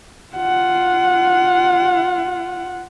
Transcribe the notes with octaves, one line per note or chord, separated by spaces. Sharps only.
F4 F#5